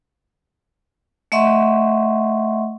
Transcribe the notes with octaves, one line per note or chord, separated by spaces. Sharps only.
A3 D#5 E5 F#5 C6 C#6